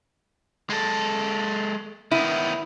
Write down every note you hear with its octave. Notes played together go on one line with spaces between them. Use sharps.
G#3 A4
D#3 B3 E4